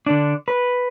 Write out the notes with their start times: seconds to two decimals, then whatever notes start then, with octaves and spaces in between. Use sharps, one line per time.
0.06 D3 D4
0.48 B4